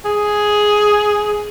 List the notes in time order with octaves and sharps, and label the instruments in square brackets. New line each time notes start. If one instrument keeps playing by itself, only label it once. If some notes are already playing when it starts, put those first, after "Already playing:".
[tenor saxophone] G#4